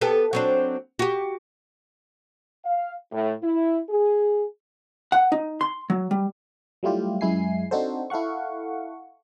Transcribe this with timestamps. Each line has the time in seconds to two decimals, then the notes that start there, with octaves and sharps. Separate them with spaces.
0.01 B3 G4 A4
0.33 F#3 C4 D4
0.99 F#4 G4
2.65 F5
3.12 A2
3.41 E4
3.89 G#4
5.12 F#5
5.32 D#4
5.61 C6
5.90 F#3
6.11 G3
6.83 F#3 G3 A3 E4 F4 G4
7.21 F#2 G#3 E4 G#5 C7
7.71 C4 D4 D#4 F#4 A4 C5
8.10 E4 A4 F5 F#5 C#6